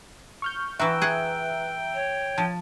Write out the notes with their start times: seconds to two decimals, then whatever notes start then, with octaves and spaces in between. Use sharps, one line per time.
0.42 C#6 F6 G6
0.79 E3 F#4 B4 E5 G5 A#5 E6
1.02 G#4 F#5
1.94 C#5
2.38 F3 A5